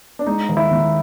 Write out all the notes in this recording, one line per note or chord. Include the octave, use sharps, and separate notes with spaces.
D4
G#3 D#4
D#2
E4
D#3